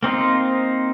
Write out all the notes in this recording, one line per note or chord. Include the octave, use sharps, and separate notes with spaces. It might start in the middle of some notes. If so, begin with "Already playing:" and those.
A#3 C4 D#4 F4